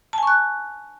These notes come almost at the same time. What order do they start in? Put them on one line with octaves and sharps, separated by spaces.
A5 G#5 C#6 F#6